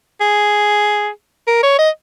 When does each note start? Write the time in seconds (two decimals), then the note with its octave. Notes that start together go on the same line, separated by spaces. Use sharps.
0.21 G#4
1.48 A#4
1.63 C#5
1.79 D#5